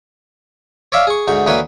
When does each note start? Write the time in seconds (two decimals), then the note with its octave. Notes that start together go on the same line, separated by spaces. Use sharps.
0.92 C#5 D5 E5 F5
1.07 G#4 C#6
1.28 D2 G#2 C#6
1.47 D2 E3 A#3 B4 C#5